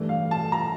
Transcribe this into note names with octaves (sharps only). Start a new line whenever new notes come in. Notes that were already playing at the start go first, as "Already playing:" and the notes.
Already playing: G2 E3 A3
F5
A5
A#5